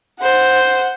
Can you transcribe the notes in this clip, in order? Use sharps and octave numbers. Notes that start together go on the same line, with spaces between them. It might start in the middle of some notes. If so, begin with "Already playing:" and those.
C5 F#5